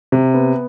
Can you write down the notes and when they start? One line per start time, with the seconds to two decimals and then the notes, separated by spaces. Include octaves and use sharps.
0.12 C3
0.34 B3